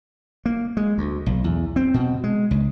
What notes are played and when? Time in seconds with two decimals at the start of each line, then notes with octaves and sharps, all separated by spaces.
0.46 A#3
0.77 G#3
0.98 D2
1.26 B1
1.44 E2
1.76 C4
1.94 B2
2.24 G#3
2.51 C#2